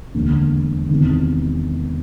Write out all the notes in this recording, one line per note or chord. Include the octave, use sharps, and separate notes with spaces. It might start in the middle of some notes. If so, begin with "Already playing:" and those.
E1 D#2 D3
E2 C3 D#3